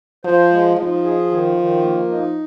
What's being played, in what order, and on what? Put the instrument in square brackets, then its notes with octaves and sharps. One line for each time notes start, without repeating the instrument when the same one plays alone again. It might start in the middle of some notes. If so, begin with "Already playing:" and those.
[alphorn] F3 [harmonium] C5
[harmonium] G#3
[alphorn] F3 [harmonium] D#4
[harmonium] G#4
D#3
D#3
A#3
D#4